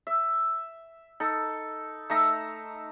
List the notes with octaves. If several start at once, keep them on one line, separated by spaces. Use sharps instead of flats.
E5
D#4 A4
A3 D#4 A#5 E6